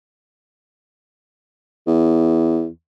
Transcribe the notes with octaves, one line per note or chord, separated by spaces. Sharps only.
E2